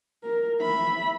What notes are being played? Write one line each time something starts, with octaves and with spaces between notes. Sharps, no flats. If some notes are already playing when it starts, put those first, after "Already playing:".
A#4
E5 B5